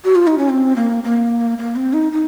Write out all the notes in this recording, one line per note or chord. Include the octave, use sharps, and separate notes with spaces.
F#4
F4
D#4
C#4
C4
A#3
A#3
A#3
C4
D#4
D#4